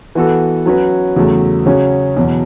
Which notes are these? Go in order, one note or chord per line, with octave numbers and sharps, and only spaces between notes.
E3 B3 F#4 A4
F#3 C#4 F#4 B4
E2 C#3 F#3 A3
C#3 F#3 C#4 F#4
E2 B2 F#3